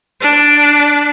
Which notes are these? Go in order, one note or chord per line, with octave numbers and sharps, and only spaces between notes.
D4